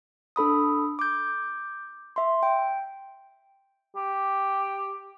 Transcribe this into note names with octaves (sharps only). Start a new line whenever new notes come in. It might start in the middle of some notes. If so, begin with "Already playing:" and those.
D4 A4 B5 D#6
D6 G6
E5 C6
G5
G4